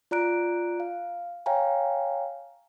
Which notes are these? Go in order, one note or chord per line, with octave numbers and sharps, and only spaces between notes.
F4 D5 A#5 F#6 D7
F5
C#5 F5 G5 G#5 A#5